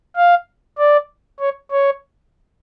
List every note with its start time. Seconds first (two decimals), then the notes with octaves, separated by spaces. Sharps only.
0.16 F5
0.78 D5
1.40 C#5
1.72 C#5